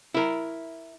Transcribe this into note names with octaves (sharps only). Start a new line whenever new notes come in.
E4 A#4